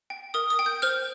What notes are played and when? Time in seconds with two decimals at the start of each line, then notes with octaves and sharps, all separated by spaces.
0.10 G5
0.34 A#4 D#6
0.50 D#6
0.59 G5
0.66 G6
0.82 C5 F6